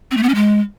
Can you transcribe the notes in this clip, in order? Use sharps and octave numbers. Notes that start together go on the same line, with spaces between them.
C4
A3
B3
C#4
G#3